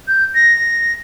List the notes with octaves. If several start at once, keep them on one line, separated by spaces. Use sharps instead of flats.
G6
A#6